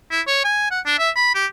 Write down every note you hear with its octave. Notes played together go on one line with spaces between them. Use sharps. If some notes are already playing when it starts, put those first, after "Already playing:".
E4
C#5
G#5
F#5
D4
E5
B5
G4